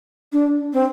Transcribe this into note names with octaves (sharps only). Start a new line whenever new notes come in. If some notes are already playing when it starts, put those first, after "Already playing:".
D4
C4